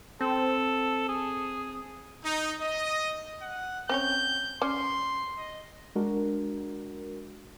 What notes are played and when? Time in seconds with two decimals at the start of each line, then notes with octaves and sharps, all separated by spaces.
0.21 C4 A4
1.09 G#4
2.24 D#4
2.61 D#5
3.41 F#5
3.89 C4 C#4 C#5 G6
4.62 C#4 D5 C6
5.37 D#5
5.95 G#3 D4 F#4 A#4